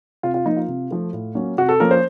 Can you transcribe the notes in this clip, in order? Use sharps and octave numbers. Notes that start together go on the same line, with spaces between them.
C3 F4
F4
F3 A#3 D#4
F4
C3
F3 A3
A2
F#3 A#3 C#4
C3 F#4
A4
F3 A#3 C#4 A#4
C5